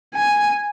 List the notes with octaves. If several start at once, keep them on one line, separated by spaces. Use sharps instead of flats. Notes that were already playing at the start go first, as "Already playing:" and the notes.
G#5